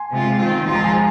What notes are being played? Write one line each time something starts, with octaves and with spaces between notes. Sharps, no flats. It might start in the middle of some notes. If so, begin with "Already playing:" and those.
Already playing: G#5 C6
C3 G#3 F4
D#3 C4 F4
F3 G#3 F4 C6
A#5
G#5 C6